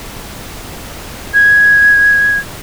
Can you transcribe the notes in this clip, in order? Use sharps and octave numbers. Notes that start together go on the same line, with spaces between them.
G#6